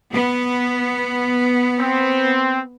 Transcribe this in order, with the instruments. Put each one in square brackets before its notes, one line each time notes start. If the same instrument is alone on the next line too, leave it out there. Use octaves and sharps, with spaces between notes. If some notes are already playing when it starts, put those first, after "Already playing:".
[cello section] B3
[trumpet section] C4